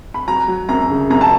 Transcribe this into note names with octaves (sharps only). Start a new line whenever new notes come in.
B5
F#3 A#5
F#3
F#2 A#5
C#3
F#2 A#5
A5